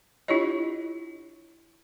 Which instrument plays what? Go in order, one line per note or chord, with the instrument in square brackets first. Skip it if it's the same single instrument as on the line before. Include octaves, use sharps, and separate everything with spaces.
[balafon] D4 E4 F4 G4 C#5 D#5